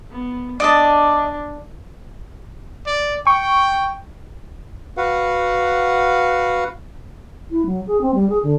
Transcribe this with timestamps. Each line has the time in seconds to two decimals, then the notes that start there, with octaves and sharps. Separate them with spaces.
0.11 B3
0.60 D4 D5 D#5 A5
2.86 D5
3.27 G5 C#6
4.97 F#4 B4 F5 F#5
7.51 E4
7.65 F#3
7.87 G#4
8.01 C4
8.14 G3
8.29 G#4
8.43 D3